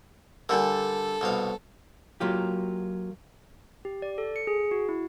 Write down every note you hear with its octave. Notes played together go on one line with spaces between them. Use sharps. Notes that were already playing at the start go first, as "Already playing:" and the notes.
D3 G3 D4 A4 A#4
C2 B2 F5
F#3 A#3 F4 G4
G4
D5
A4
C#7
G#4
F#4
E4